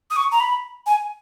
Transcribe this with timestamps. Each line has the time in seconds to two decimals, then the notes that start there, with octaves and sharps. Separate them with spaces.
0.11 D#6
0.16 C#6
0.32 A#5
0.40 B5
0.87 G#5